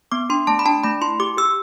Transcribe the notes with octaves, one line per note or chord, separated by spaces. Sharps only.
B3 D6
D4 C6
A3 A5
B5
D4 A5
A3 B5
E4 C6
G4 D6
G4 E6